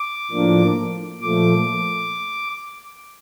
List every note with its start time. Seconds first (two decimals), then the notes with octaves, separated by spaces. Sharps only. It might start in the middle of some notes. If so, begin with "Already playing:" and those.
Already playing: D6
0.31 A2 F3 A#3 D4
1.21 A#2 F3 A3 D6